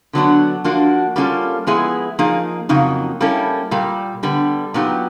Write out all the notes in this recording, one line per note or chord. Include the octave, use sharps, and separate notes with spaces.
D3 F#3 B3 D4 F#4
F3 A#3 D4 F#4
G3 A#3 C#4 F4 A4
F3 G#3 B3 E4 G#4
F3 A#3 D#4 G#4
F2 C#3 F#3 A#3 D#4
G3 A#3 C#4 E4 A4
A#2 G3 A#3
D3 G3 B3
A#2 F#3 B3 D#4 G4